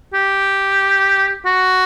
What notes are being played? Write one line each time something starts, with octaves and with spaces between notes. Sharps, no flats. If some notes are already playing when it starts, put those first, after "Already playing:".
G4
F#4